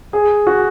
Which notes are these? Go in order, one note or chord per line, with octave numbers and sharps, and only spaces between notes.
G#4
F#4